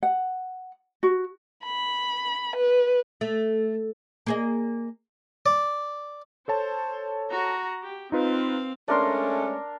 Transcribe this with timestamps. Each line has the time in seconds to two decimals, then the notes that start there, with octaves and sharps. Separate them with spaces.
0.03 F#5
1.03 F#4
1.64 B5
2.56 B4
3.21 A3
4.26 A#3 G#4 D#5
5.46 D5
6.48 A4 C5 C#5 A5
7.31 F#4 A#5
7.83 G4
8.12 C4 D#4 F4 B4 F5
8.88 G#3 A3 C#4 D4 A#4 C6